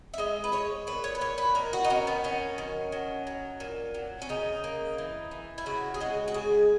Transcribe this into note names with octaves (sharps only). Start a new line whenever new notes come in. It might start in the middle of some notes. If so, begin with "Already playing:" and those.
E5
G#3 D#5
B4
G#3 C#5
A#2 B4
C#5
B4
A#2 C#5
B4
D#3 A#4
F#4
D#4
D#3 C#4
B3
F#3 C#4
D#3
F#3
F#3
A#2
F#3
C#4
C#3 D#4
A#3
E3
E3
E4
C#3 F#4
G#4
G#3 F#4
F#4
C#3 G#4